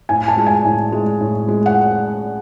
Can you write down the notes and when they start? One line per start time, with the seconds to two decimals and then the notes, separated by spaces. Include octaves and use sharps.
0.09 A2 G#5
0.28 A5
0.37 G#3
0.47 G#5
0.65 A2
0.92 G#3
1.21 A2
1.48 G#3
1.66 F#5